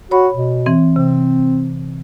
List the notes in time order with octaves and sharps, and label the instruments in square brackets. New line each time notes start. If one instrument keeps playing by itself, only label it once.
[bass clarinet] F#4 [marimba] C#5 B5
[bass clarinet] B2
[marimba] E3 C4
[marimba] C3 [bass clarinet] C4